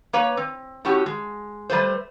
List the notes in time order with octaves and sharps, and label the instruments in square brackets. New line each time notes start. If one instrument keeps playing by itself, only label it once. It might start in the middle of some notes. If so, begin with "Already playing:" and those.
[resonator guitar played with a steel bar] A#3 B4 C#5
C4
A2 C#4 F#4 G4
G#3
G3 A3 B4 C5